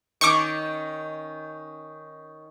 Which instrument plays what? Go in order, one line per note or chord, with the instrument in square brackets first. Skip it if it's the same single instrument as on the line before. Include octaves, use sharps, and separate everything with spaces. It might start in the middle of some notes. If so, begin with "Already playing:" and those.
[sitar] D#3 C#4 [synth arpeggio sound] C#6 D6